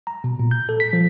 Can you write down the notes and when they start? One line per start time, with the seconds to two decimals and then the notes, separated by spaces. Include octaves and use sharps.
0.07 A#5
0.24 B2
0.40 A#2
0.51 G6
0.69 A4
0.80 B6
0.93 F3